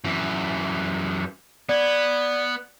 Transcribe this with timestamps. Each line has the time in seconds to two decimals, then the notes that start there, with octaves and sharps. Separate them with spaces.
0.05 F#2 E3
1.69 B3 D5 G#6